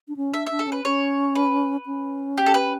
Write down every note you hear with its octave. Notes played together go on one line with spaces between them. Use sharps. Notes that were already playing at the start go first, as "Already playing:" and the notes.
D4
C#4
D4 E5
D4 E5
A4
C#4 B4
C#4 C#5
B4
C#4
G4
A4
B4